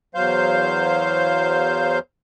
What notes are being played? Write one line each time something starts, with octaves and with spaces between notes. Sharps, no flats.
E2 F#3 C5 F5 G6